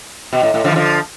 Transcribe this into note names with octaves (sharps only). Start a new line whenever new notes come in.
B2
A2
A2
D3 F3
E3
D3 F3